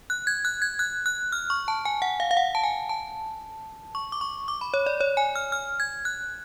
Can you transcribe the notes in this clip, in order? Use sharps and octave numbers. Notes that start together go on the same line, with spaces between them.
F#6
G#6
F#6
G#6
F#6
F#6
F6
C#6
A5
G#5
F#5
F5
F5
F#5
A5
G#5
A5
C#6
D6
C#6
D6
B5
C#5
D5
C#5
G#5
F6
F6
G#6
F#6